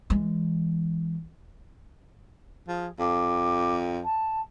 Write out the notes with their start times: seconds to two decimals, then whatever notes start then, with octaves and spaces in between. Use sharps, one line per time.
0.10 E3 G#3
2.68 F3 G#4
2.99 F2 D6
4.04 A5